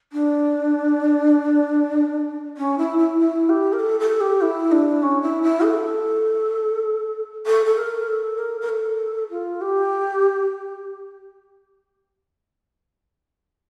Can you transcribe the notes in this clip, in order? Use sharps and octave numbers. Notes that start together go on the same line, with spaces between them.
D4
C#4
E4
E4
E4
G4
A#4
A4
A4
G4
E4
D4
C#4
E4
E4
A4
A4
A4
A#4
A4
A#4
A#4
A4
F4
G4